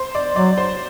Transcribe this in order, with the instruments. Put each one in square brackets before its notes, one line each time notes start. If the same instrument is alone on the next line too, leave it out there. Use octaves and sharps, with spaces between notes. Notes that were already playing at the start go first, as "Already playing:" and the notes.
Already playing: [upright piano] C5
D5
[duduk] F#3 [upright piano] D5
[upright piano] C5